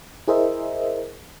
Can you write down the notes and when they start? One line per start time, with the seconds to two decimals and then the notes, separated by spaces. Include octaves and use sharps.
0.28 E4 G#4 A#4 C5 D#5 E5